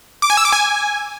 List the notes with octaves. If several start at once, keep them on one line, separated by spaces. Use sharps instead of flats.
D6
G#5
E6
D6
G#5